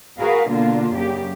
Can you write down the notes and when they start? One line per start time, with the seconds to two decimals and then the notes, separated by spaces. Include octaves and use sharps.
0.19 F#4 G#4 A#4 B4 F5
0.50 B2 D3 A#3 D4 F4
0.94 F#2 C#3 G4